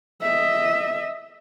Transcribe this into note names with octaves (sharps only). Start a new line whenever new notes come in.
D#5 E5